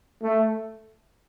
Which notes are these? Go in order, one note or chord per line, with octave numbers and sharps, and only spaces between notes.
A3